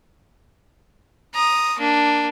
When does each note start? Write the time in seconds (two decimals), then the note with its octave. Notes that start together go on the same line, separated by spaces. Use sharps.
1.34 A#5 D#6
1.78 A#3 D4